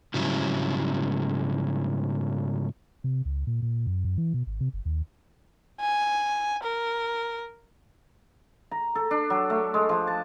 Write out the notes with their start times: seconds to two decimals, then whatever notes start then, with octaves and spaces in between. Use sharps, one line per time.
0.14 G#2 C#3 F#3 G3 E4
3.04 C3
3.25 C#2
3.47 A#2
3.62 A#2
3.87 F#2
4.04 F#2
4.18 E3
4.34 B2
4.47 G#1
4.60 C3
4.73 F#1
4.85 D#2
5.81 G#5
6.63 A#4
8.71 A#5
8.95 A4
9.11 D4
9.30 F#3
9.50 A3
9.74 G#3
9.89 F3
10.07 A5